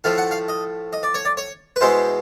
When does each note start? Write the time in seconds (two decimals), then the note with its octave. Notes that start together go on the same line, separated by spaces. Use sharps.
0.04 A2 F3 A3 F5
0.18 F#5
0.31 F5
0.48 D#5
0.93 D#5
1.03 D5
1.14 C#5
1.25 D5
1.37 C#5
1.76 B4
1.81 B2 G#3 B3 E4 C5